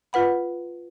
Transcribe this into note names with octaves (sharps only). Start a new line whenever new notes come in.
F4 B4 F#5 B5